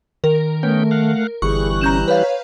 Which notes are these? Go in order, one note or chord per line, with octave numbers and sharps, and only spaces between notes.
D#3 A#4
A3 B3 C#4 G5
F5 F#5
G1 E3 G3 G#4 C#6 F#6
C#4 A#5 G6 E7
B4 C#5 F5